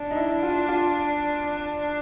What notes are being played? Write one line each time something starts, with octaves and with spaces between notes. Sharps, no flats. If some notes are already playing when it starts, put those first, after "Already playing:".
Already playing: D4
D#4
E4
F4
F4
D4